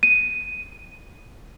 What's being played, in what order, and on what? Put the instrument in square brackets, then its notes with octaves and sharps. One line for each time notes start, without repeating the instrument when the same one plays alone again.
[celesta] D#7